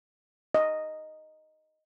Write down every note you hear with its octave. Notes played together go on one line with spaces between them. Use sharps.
D#5